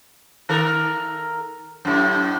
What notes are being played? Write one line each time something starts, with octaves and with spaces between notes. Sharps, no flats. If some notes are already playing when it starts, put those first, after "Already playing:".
D#3 A4 A#4
F#2 A2